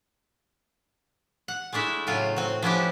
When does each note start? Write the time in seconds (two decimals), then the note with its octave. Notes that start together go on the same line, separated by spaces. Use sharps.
1.48 F#5
1.73 G#3 A3 D4 E4 E5
2.07 A2 C#3 F#3 F4
2.36 C4 F#4
2.62 F3 B3 C#4 D4 E4 G4